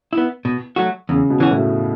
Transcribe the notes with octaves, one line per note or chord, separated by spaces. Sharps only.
B3 E4
B2
F#3 A3 F#4
E2 C#3
B2
E3 C#4 F#4
A2